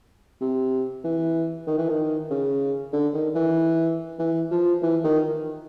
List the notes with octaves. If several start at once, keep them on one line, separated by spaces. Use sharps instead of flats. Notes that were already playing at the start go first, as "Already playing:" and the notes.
C3
E3
D#3
E3
D#3
C#3
D3
D#3
E3
E3
F3
E3
D#3